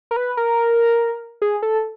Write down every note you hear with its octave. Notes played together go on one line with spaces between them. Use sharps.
A#4
B4
A#4
G#4
A4